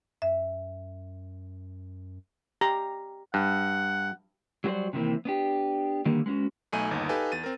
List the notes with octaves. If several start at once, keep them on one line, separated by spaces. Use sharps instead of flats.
F#2 E5
G4 A#5
G2 F#5
F#3 G3 F#4 B4 C5 D5
C3 D#3 E3 A#3 C4
B3 D4 G4
D3 D#3 G3 A#3
G#3 B3 C#4 F#4
B1 A3 D#4 G#5 D#7
G1 D#2 D#4
D#4 G4 A4 B4 F5 G#5
E2 A6 D#7
C4 A#4